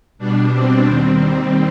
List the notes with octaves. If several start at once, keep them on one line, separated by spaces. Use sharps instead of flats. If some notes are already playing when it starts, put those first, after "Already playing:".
B2 G3 D4
C4
D#2 D#3 G3 C4